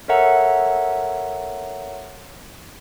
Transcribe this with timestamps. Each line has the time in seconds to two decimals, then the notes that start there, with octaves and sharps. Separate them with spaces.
0.08 A4 A#4 C#5 E5 F#5 A#5